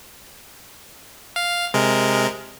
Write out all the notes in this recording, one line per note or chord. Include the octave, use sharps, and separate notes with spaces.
F5
C3 G#3 A#4